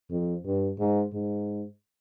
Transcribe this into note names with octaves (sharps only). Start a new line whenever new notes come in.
F2
G2
G#2
G#2